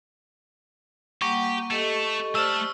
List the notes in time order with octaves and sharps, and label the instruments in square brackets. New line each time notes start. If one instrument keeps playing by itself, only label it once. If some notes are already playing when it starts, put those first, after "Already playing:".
[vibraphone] G3 A#3 F#5 [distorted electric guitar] G4 [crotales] C#6
[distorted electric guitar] A3 [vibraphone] G4 A4 D#5
[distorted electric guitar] A3 A5 [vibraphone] G4 C5 D5 [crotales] E6 F6